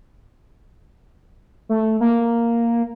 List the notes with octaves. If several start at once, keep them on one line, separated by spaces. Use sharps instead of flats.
A3
A#3